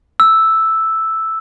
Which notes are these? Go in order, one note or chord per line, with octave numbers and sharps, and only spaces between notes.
E6